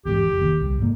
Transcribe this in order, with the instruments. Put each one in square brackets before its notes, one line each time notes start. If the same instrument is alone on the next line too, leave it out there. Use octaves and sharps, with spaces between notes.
[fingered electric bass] E2 G#2 [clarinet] G4
[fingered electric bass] F1
D#2
C2
G#2 A#3